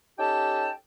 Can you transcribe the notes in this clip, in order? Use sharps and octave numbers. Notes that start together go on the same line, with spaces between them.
C#4 D#4 G4 A4 G5 A5